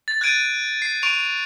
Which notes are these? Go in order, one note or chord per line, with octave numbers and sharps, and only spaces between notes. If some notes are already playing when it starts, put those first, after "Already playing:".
A6
F#6 G#6 A6 D7 D#7
C7
C#6 D7 F7